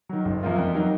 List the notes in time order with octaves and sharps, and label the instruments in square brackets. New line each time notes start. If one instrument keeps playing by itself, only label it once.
[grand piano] D#3 F#3
F#1
F#2 F3 A#3 F4
F2
D#3 F#3 A#3 D#4